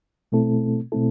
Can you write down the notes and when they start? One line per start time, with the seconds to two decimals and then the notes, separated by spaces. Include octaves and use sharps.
0.32 B2 A3 C4 E4 A4
0.92 B2 A3 C4 E4 A4